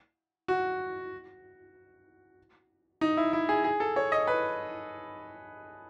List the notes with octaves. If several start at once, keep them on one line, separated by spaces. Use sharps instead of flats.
F#4
D#4
E4
E4
G#4
G#4
A4
C#5
D#5
B4